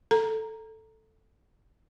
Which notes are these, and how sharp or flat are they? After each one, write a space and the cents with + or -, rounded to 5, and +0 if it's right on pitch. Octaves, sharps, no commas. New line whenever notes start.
A4 +0 A#5 +0